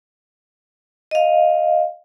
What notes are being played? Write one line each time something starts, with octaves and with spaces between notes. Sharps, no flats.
D#5 F5